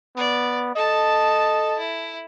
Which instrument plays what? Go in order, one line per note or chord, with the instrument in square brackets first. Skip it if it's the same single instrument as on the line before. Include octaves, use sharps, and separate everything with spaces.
[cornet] B3 [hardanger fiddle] D5
[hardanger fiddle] A4 A5 [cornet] D#5
[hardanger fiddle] E4